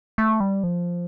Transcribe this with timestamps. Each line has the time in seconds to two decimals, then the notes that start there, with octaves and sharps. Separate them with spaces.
0.18 A3
0.40 G3
0.64 F3